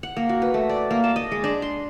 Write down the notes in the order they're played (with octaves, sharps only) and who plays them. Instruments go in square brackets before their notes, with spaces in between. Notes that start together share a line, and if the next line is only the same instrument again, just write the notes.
[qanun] F#5
A#3
F#4
B4
A3
D5
A#3
A5
D#5
G#3
D4
C6